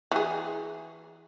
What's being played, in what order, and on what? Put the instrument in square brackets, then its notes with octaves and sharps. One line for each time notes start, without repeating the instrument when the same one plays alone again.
[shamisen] E3 G#4